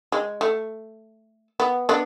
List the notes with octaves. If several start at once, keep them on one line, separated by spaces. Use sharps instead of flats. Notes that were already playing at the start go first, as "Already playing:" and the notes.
G#3
A3
B3
B3 D4